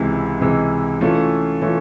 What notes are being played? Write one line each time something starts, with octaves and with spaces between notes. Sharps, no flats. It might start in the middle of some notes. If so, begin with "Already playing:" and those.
Already playing: C#2 C3 E3 G#3
C#2 C3 E3 G#3
E3 A3 C#4 F4
E3 A3 C#4 F4